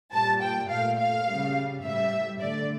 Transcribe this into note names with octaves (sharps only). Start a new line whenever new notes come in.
A#2 G3 A5
G5
A#2 A3 F5
F5
C#3 G3
A2 G3 E5
D3 A3 D5